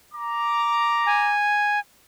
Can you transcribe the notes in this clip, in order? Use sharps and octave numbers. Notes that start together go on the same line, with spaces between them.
A#5 D6
G#5